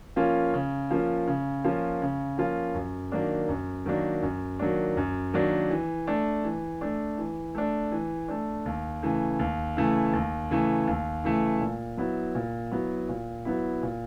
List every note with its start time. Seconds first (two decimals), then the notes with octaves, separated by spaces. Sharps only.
0.16 F3 A#3 C#4 F4
0.54 C#3
0.91 F3 A#3 C#4 F4
1.27 C#3
1.64 F3 A#3 C#4 F4
2.02 C#3
2.38 F3 A#3 C#4 F4
2.75 F#2
3.12 D#3 F#3 A#3 D4
3.49 F#2
3.85 D#3 F#3 A#3 D4
4.23 F#2
4.59 D#3 F#3 A#3 D4
4.97 F#2
5.34 D#3 F#3 A#3 D4
5.70 E3
6.07 A3 D4
6.44 E3
6.81 A3 D4
7.18 E3
7.55 A3 D4
7.92 E3
8.28 A3 D4
8.66 D#2
9.03 C#3 E3 A3
9.39 D#2
9.77 C#3 E3 A3
10.13 D#2
10.50 C#3 E3 A3
10.87 D#2
11.24 C#3 E3 A3
11.61 A#2
11.97 F#3 B3 E4
12.35 A#2
12.71 F#3 B3 E4
13.09 A#2
13.45 F#3 B3 E4
13.83 A#2